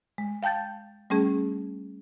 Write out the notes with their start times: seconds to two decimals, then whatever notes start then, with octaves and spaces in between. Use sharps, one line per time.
0.18 G#3
0.43 F5 G5 A5 G6 A6
1.10 G3 A3 C#4 G#4